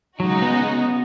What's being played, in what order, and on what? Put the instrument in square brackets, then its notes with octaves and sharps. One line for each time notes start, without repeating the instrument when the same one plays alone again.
[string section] C#3 G#3 D#4 F#4 [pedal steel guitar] F#3
[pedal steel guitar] B3
B3